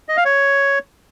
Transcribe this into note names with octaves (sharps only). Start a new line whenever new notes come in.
D#5
F5
C#5